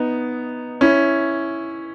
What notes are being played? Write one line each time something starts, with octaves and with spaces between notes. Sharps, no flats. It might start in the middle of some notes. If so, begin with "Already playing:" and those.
Already playing: B3 D#4
C#4 E4